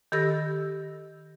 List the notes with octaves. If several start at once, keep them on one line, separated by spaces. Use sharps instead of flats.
D#3 G4 A4 B5 E6 A#6